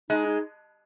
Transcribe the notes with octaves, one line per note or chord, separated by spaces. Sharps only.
G#3 D#4
D#4